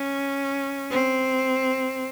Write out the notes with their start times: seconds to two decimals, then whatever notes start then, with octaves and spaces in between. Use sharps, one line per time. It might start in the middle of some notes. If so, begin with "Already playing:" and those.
Already playing: C#4
0.90 C4